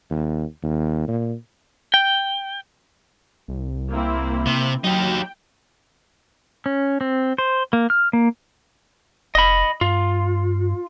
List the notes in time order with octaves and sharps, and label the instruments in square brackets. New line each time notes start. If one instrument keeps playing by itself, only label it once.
[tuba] D#2
D#2
A#2
[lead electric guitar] G5
[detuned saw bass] C2
[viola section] A#3 C4 E4
[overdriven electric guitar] C3
[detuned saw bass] F#3 [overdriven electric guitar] D#4 G4 [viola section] G5
[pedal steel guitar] C#4
C4
C5
A#3
F6
A#3
[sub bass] F1 [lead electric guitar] D#5 B5
[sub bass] G2 [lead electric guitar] F4